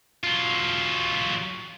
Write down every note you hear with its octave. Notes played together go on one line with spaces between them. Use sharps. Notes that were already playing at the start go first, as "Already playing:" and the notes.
F#3 F4